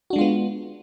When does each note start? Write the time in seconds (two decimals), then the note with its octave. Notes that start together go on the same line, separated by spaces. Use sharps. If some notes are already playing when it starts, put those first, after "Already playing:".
0.10 F#4
0.13 D4
0.16 G#3
0.18 F4
0.21 B3